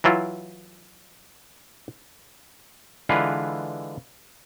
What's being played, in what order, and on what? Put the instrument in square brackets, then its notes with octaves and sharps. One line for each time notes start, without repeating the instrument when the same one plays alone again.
[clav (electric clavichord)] E3 F#3 E4 F4
D3 E3 G#3 F4 B4